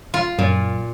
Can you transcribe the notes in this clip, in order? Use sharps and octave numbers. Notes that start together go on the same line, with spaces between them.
F4
F#2 A#2